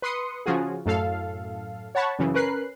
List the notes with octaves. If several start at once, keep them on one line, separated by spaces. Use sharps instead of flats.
B4 C6 D#6 C#7
C#3 F3 F4 F#4 G#4
F#2 A2 A4 F5
C#5 F#5 A5 B5 C#6
F#2 C#3 E3
C#4 A#4 B4 F#6 C7